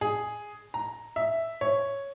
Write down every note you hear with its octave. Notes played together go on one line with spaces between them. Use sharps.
G#4
A#5
E5
C#5